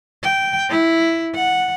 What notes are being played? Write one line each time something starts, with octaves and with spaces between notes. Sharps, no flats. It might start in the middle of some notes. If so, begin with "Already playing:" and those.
G5
E4
F#5